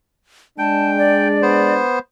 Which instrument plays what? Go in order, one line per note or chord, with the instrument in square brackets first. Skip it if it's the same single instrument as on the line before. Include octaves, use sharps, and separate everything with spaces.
[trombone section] G#3 D4 [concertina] G5 [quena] A5
[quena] D5
[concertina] B3 C5